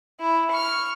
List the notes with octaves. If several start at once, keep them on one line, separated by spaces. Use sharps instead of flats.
E4
C#6 F6